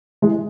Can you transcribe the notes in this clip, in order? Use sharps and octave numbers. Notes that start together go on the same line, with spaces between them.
E3 G#3